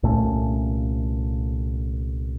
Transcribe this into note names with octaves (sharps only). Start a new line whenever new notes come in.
C2 A#2 A3 C#4